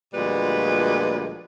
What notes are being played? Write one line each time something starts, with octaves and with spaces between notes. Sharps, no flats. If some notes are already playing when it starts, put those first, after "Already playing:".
D2 A#2 F3 G3 G#3 B4